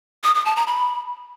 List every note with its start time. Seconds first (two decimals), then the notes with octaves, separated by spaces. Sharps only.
0.24 D#6
0.35 D#6
0.45 A5
0.56 A#5
0.67 B5